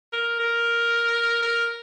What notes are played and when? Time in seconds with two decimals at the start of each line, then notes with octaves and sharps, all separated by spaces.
0.13 A#4
0.39 A#4
1.42 A#4